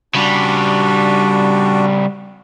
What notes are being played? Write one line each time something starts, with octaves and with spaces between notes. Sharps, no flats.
C#3 G3 D4 F#4